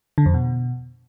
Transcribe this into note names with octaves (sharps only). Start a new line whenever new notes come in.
D3
F2
B2